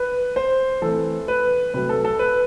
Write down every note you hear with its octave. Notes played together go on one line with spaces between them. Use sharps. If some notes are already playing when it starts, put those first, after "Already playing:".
Already playing: B4
C5
E3 A3 C4 A4
B4
C3 F#3 A3 B4
A4
A4
B4